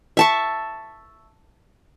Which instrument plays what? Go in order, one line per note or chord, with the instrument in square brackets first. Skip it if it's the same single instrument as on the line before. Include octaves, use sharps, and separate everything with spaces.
[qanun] E5 A5 C#6